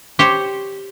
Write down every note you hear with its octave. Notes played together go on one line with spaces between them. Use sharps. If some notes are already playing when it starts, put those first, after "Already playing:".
G4 C5 C#5